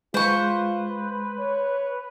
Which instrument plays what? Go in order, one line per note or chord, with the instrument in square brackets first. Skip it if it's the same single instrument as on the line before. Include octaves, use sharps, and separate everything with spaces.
[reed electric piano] G#3 [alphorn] F4 [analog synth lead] B4 [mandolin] C5 C#6
[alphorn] C#5